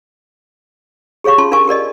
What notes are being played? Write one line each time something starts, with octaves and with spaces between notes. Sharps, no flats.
G4 G#4 C#5 F5 C#6
C#4 F4 A5 C6
D4 A#4 F5 G#5 C#6
G4 A#4 D5 D#5